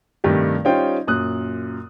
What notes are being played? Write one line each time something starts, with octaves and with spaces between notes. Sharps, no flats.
G2 C3 D#3 A3 G4
G3 C#4 D#4 F4 C5 G5
F#2 A#2 D#6 F#6